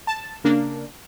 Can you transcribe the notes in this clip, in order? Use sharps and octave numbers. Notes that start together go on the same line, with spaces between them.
A5
C#3 A#3 D4